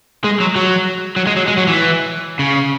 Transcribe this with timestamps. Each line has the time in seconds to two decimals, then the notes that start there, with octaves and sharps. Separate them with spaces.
0.24 G#3
0.40 F#3
0.56 F#3
1.16 F#3
1.27 G#3
1.37 F#3
1.48 G#3
1.58 F#3
1.68 E3
2.39 C#3